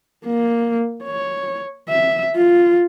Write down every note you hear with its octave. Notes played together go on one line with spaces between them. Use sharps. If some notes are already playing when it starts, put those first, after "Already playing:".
A#3
C#5
E5
F4